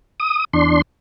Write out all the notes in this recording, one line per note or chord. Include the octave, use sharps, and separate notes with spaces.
D#6
E2 D4 C6